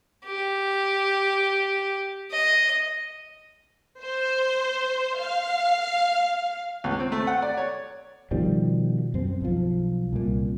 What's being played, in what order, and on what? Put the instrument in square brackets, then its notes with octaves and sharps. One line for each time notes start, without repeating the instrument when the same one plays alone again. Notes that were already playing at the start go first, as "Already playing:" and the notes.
[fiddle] G4
D#5
[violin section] C5
F5
[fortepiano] C#2
C4
A3
F#5
D5
C#5
[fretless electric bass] B2 D#3 F3 G3
F#2 C4
B1 F3
C2 A#2